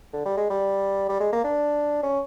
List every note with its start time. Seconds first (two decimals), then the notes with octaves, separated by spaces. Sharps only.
0.13 D3
0.26 G3
0.37 G#3
0.50 G3
1.09 G3
1.20 G#3
1.33 A#3
1.44 D4
2.03 C#4